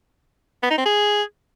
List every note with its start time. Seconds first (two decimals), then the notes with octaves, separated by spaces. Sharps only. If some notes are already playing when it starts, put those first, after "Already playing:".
0.63 B3
0.71 D#4
0.78 C4
0.86 G#4